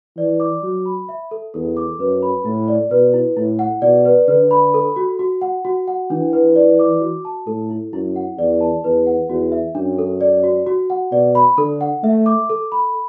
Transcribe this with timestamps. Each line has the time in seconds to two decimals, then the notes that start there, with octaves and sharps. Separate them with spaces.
0.17 E3 D5
0.40 D6
0.63 F#3 F#4
0.86 B5
1.09 E5
1.31 A4
1.54 E2 A4
1.77 D6
2.00 F#2 B4
2.22 B5
2.45 A2 E4
2.68 D5
2.91 B2 B4
3.14 E4
3.36 A2 E4
3.59 F#5
3.82 B2 D5
4.05 B4
4.28 D3 B4
4.51 B5
4.74 A4
4.96 F#4
5.19 F#4
5.42 F#5
5.65 F#4
5.88 F#5
6.10 E3 D4
6.33 B4
6.56 D5
6.79 D6
7.01 F#4
7.25 A5
7.47 A2 A4
7.70 E4
7.93 F#2 E4
8.16 F#5
8.38 E2 D5
8.61 A5
8.84 E2 B4
9.07 F#5
9.29 E2 F#4
9.52 E5
9.75 F#2 D4
9.99 A4
10.21 D5
10.44 F#4
10.67 F#4
10.90 F#5
11.12 B2 D5
11.35 B5
11.57 D3 A4
11.81 F#5
12.03 A3 E5
12.26 D6
12.50 A4
12.72 B5